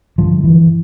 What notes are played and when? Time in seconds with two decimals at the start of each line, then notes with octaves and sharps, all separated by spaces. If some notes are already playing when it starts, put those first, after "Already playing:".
0.18 G2 D3 F3
0.44 E3